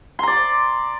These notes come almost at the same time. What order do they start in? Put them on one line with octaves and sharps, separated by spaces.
C6 A#5 D5